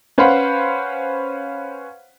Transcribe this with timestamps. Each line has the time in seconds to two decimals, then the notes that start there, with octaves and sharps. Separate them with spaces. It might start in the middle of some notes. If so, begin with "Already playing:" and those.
0.18 C#4 B4 C5 F5 F#5 B5